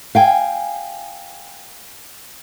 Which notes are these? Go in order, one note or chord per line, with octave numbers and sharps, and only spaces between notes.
F5 G5 G#5